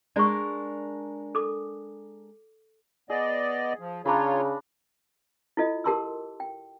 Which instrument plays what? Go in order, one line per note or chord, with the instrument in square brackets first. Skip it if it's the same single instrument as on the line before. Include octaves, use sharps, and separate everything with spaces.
[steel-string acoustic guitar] G#3 D4 A#4 [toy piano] D5 C#6
[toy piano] A4 D6
[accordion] B3 D5 D#5 [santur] G#4
[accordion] F3
[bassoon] C#3 [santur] D4 A#5 B5 [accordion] F4 C#5
[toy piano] E4 F4 A4 D#5
G4 A#4 A5 C6 D6 E6
G5